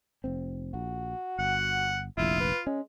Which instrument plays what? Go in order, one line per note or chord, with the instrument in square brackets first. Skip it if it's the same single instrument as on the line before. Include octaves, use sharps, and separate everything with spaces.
[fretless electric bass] F1 C4
[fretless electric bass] A#1 [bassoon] F#4
[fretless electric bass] G1 [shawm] F#5
[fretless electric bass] F1 A#1 [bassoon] E4 [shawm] F4
[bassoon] B4
[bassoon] G#3 [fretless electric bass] C#4